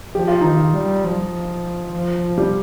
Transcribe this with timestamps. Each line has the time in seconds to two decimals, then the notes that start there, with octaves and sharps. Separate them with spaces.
0.15 F3 G4
0.28 F4
0.41 D#3 D#4
0.54 F4
0.74 G3
1.04 F3
1.93 F3
2.38 G3